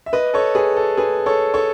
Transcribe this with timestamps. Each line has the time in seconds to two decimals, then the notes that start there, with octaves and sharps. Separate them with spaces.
0.06 E5
0.13 B4 D#5
0.34 A4 C#5
0.55 G#4 B4
0.77 A4
0.97 G#4 B4
1.26 A4 C#5
1.54 A4 C#5